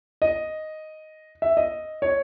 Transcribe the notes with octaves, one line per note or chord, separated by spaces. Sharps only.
D#5
E5
D#5
C#5